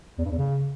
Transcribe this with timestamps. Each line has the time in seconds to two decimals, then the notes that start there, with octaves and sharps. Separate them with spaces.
0.18 E2
0.25 G2
0.31 E2
0.38 C#3